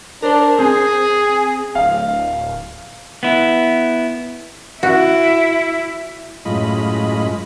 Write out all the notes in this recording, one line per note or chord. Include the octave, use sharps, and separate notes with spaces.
D4 A#4 C5
C4 G#4
D1 F5
B3 E4
E4 F#4
F#2 A2 G#3 F4 D#5 B5